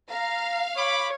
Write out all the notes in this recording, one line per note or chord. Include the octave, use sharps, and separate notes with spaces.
F5 A#5
C#5 B5 D6